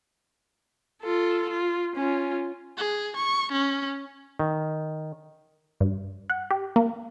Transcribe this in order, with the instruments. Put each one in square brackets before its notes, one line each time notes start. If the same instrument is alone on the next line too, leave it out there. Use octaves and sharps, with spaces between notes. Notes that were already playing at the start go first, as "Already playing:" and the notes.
[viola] F4 A4
F4
C#4 F4
[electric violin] G#4
C#6
C#4
[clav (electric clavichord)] D#3
[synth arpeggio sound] G2
F#5
G4
A#3